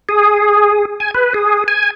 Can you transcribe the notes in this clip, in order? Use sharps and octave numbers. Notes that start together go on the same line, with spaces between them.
G#4
G#5
B4
G#4
G#5